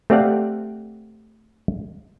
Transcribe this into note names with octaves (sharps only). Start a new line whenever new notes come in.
A3 C4 G4 D5 F5 F#5